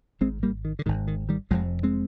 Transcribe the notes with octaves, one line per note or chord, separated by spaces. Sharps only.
G#1 G#2 G#3 C4
G3 A#3
D#3
D3
G#1 G#2 D#3
D#3
D#3 G3
F1 F2 C3 F3 G#3
G#3 C4